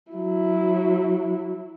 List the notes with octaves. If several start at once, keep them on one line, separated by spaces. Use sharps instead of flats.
F#3 E4